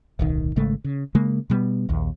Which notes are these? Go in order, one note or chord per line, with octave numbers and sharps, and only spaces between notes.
D1 B1 D#3
G#1 C#3 G#3 A3
C#3
C#3 G#3 A#3
B2 G3 B3
A#1 D#2